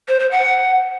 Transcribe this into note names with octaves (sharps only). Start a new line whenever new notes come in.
C5
C5
F#5